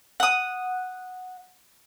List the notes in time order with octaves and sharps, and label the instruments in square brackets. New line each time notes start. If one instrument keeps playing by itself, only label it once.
[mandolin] F#5 D#6